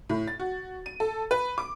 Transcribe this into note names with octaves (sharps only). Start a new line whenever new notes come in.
A2
A6
F#4
D#7
A4
B4
D6